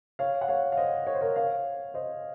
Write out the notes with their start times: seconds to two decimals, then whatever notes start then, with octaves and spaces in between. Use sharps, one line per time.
0.19 C#5 F5
0.41 F#5
0.48 C#5 F5
0.72 F5
0.77 C5 D#5
1.07 C#5
1.14 C5
1.21 A#4 C#5
1.36 C#5 F5
1.94 C5 D#5